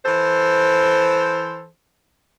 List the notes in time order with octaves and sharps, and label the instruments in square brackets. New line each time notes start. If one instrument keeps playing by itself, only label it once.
[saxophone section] E3 A4 C5